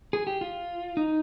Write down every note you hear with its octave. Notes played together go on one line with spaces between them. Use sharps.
G#4
G4
F4
D#4